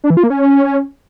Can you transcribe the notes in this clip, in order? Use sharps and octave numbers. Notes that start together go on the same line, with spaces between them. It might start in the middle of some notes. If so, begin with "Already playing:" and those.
D4
E3
F4
A#3
C#4